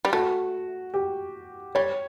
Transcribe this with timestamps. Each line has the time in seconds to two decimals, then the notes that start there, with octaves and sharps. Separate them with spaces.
0.05 G3
0.13 A3 F#4
0.94 G4
1.75 G3 C#5